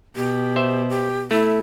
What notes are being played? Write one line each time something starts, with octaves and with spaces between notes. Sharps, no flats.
B2 G4
C5 E5
G4
A3 E4